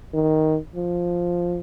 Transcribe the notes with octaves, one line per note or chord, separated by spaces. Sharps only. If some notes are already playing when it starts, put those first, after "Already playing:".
D#3
F3